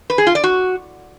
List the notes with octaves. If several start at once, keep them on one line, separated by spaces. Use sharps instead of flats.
B4
G#4
F4
D5
F#4